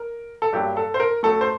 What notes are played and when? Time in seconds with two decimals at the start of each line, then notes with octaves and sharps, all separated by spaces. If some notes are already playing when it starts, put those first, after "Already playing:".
Already playing: A#4
0.42 A4
0.52 G2 F#3 A#3 G4
0.77 A4
0.94 C5
1.00 A#4
1.23 F#2 F#3 A3 A4
1.41 C5